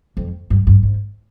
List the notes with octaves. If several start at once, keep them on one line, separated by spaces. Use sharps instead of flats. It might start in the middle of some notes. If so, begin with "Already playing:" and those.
F2
G2
G2
G#2